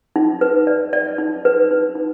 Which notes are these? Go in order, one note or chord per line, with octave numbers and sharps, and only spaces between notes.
D#4
B4
D5
D5
D#4
B4
D#4
D#4